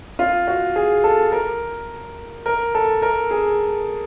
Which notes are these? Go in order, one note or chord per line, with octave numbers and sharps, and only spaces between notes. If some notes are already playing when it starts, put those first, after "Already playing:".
F4
F#4
G#4
A4
A#4
A#4
A4
A#4
G#4